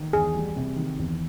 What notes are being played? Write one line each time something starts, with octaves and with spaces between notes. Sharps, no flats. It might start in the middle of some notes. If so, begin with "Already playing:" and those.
Already playing: D#3
E2 G#4
G3
C3
D#3
E2